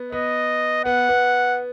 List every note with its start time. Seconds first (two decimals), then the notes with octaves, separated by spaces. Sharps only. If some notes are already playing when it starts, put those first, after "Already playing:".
Already playing: B3
0.12 B3 D#5
0.85 B3 F#5
1.09 B3